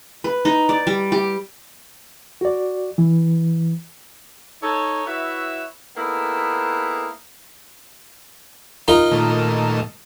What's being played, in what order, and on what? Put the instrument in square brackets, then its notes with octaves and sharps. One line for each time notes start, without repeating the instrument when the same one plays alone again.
[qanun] B4
D#4
D5
G3
G4
[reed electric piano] F#4 D5
E3
[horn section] D#4 A4 C#5
E4 F#4 B4 C#5 E5
A#3 B3 D#4 E4 G#4 A4
[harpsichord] D#4 F4 A#4
[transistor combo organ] A#2 D#3 A3